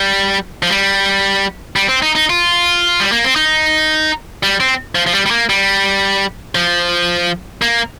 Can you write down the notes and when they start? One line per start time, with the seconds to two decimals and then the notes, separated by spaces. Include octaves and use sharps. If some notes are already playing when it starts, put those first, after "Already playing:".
Already playing: G3
0.63 F3
0.70 G3
1.76 G3
1.89 C4
2.02 D#4
2.15 D#4
2.30 F4
3.00 G3
3.12 A#3
3.24 C4
3.36 D#4
4.43 G3
4.60 C4
4.95 F3
5.07 F3
5.13 G3
5.26 G3
5.31 A#3
5.50 G3
6.55 F3
7.62 A#3